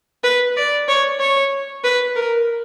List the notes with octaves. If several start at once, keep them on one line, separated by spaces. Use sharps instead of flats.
B4
D5
C#5
C#5
B4
A#4